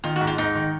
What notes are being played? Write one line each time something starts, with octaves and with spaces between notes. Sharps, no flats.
D#3 F4
G#2 F#4
F4
G#2 D#4
D#3